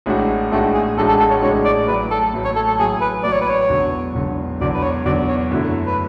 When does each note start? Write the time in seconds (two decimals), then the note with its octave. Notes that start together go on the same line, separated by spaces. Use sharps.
0.06 A1 A2 G#3 D4 F#4
0.51 A1 A2 G#3 A3 D4 F#4
0.74 G#4
0.97 A1 A2 G#3 D4 F#4 A4
1.09 A4
1.20 A4
1.30 C#5
1.42 A1 A2 G#3 D4 F#4 C#5
1.65 D5
1.88 A1 A2 F#3 B4
2.11 A4
2.34 A1 A2 F#3
2.45 C#5
2.56 A4
2.68 A4
2.79 A1 A2 F#3 G#4
3.01 B4
3.24 A1 A2 F#3 D5
3.33 C#5
3.41 B4
3.50 C#5
3.69 E1 E2 D3 F#3
4.15 E1 E2 D3 F#3
4.61 E1 E2 D3 F#3 D5
4.74 B4
4.83 C#5
5.05 E1 E2 D3 F#3 D5
5.28 C#5
5.51 F#2 D3 A3 E4
5.87 B4